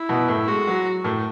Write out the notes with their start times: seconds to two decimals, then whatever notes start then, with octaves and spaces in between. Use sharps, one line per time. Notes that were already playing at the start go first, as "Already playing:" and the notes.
Already playing: E4
0.09 B2 B3
0.28 A2 A3
0.47 G#3 F#4
0.67 F#3
1.04 A2 A3